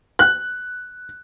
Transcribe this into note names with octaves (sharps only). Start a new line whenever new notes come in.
F#6